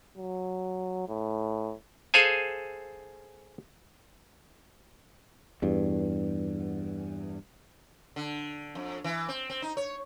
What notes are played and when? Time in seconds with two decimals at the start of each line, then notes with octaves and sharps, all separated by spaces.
0.18 F#3
1.09 A2
2.14 G#4 A4 C5 F5 G#5
5.62 E2 G2
8.16 D3
8.75 F2
9.04 E3
9.28 C4
9.50 C4
9.62 D#4
9.77 C#5